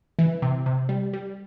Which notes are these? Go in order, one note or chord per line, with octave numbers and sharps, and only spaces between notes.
E3
C3
C3
G3
G3